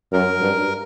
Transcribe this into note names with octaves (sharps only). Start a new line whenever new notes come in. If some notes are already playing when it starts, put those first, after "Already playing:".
F#2 A#4
G2